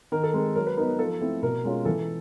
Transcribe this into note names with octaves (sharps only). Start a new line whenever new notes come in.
D#3 A#4
A4
G#3 C4 A#4
F#3 A#4
B4
B3 D#4 A#4
F3 A4
A3 C4 E4
B2 A#4
G#3 C#4 F4
E3 A4